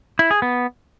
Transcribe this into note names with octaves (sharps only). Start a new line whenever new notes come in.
E4
G#4
B3